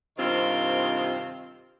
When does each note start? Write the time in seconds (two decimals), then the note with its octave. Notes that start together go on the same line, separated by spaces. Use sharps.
0.18 G2 C3 D#3 C4 F4